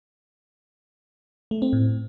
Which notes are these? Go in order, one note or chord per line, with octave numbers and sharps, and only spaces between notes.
A3
C4
A2